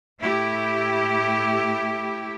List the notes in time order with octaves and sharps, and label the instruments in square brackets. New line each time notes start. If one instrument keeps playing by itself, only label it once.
[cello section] A2 A3 E4 G4